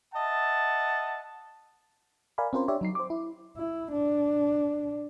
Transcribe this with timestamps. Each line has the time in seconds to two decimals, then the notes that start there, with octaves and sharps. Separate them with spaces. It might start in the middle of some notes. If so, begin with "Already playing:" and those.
0.14 D#5 E5 F#5 A5
2.38 A#4 D5 F5 G#5 B5
2.53 C4 C#4 F4 A#4 C5
2.68 D4 G4 C#5 D5 E5
2.81 F#3 D#4 C7
2.95 C5 D6
3.10 E4
3.57 E4
3.92 D4